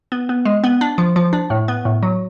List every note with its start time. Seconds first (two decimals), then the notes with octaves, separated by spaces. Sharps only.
0.12 B3
0.29 B3
0.45 G#3
0.64 B3
0.81 D4
0.98 F3
1.16 F3
1.33 D4
1.50 A2
1.68 B3
1.85 A2
2.03 F#3